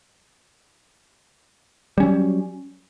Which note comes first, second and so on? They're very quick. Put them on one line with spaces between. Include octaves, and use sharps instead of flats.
G3 C#4 F#3